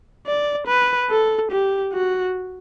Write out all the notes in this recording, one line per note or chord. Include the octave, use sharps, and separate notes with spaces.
D5
B4
A4
G4
F#4